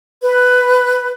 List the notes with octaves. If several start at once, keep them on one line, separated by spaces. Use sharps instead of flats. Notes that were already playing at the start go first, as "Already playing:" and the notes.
B4